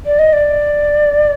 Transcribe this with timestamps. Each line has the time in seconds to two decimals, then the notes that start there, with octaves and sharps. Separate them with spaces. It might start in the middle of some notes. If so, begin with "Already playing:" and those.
0.06 D5
0.19 D#5
0.33 D5